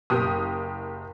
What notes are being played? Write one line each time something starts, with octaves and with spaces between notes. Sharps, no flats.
F#1 G4 D#6